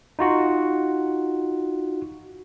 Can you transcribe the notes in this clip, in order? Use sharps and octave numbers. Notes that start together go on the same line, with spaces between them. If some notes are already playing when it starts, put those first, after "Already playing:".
D#4 F4 F#4